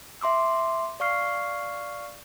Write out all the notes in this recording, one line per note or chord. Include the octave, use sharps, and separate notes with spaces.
E5 C6 D6 E6
D5 F5 C#6 F6 C7